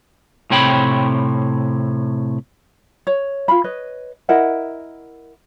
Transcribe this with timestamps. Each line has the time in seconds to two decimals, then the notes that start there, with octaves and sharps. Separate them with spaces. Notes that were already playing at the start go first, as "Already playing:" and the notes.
0.50 A2 C3 C4 C#5 G5 B5
3.07 C#5
3.48 F4 F5 B5
3.64 B4 C#5 D#5
4.29 E4 A#4 D#5 F#5